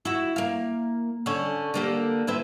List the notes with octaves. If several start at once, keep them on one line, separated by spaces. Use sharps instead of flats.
E4 F#4
A#3 F5
D3 C#4
D3 A#3 G4
C4 E4 B4